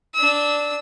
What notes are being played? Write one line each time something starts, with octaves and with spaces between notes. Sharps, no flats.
D4 E6